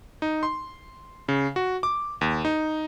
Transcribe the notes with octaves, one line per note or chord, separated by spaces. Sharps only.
D#4
C6
C#3
F#4
D6
D#2
D#4